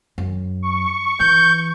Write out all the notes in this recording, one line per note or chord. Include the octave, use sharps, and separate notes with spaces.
F#2
C#6
E3 G6